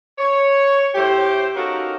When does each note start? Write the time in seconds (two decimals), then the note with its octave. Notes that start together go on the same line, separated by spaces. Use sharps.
0.18 C#5
0.95 A2 G4 C5
1.55 C#4 D#4 F#4 A4 A#4 F5